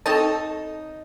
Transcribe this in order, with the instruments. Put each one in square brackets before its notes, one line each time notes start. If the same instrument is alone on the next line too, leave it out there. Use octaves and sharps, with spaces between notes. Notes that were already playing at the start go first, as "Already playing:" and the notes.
[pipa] C4 C#5 D#5 [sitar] D#4 [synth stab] A4 A5